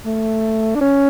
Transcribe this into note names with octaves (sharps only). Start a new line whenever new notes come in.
A3
D4
C#4